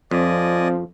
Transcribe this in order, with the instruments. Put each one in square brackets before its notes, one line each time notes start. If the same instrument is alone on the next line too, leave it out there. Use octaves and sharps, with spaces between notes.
[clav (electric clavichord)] F2 [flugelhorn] F3 [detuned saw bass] C4 [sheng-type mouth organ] D5 D#5 G#5